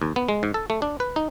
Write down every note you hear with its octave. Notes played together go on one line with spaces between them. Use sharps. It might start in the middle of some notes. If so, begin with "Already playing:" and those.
D#2
B3
G#3
G#2
A4
A3
D4
B4
D#4